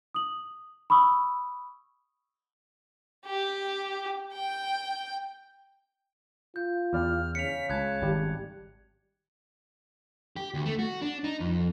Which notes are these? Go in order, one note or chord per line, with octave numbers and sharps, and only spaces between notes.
D#6 F#7
B5 C#6 D#6 E6
G4
G5
F4 G6
E2 D5 G5 F6
C#3 B6 C#7 F7
C#2 A5 F#6 G#6
G#1 G3 G4
G4
D2
A3
F#4
D4
D#4
F2